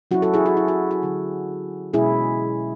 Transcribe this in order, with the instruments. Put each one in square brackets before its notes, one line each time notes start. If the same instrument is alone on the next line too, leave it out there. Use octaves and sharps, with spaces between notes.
[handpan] F#3 C#4 E4 F#4
F#4 A4
E4 G#4
F#4
E4
F#4
F#4
D3 F#3 C#4 E4
B2 G#3 C#4 E4 G#4